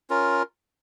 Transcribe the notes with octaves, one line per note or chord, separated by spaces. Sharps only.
C#4 F4 A#4